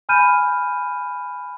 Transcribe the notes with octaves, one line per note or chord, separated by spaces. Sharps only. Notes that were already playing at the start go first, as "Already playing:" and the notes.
G#5 B5 F6 G6 D#7